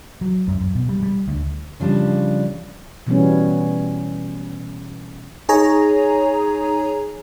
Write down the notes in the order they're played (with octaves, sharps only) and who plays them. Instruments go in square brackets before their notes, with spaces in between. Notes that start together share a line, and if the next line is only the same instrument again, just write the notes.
[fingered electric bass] F#3
F#2
F#2
B2
G3
G3
D2
[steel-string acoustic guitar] C#3 F3 G3 D4
[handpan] B2 E3 G3 B3 C#4
[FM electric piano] D#4 G#4 C#5 G#5 A#5